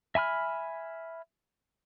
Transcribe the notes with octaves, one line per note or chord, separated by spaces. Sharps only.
E5 G#5 B5 F6